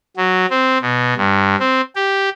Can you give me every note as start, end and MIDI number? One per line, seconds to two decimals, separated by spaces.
0.17 0.46 54
0.50 0.78 60
0.81 1.14 47
1.17 1.56 43
1.60 1.81 60
1.95 2.29 67